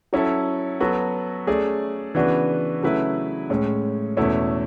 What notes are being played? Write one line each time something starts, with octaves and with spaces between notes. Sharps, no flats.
F#3 C#4 E4 A4
F#3 B3 F#4 A4
A3 C#4 G#4 D5
C#3 E3 B3 D4 F#4
C#3 F#3 A3 E4 B4
A2 G#3 C#4
E2 B2 A3 C#4 E4